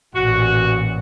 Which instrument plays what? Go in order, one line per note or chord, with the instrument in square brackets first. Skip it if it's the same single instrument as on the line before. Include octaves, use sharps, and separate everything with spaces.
[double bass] A1 A#2 [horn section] F#4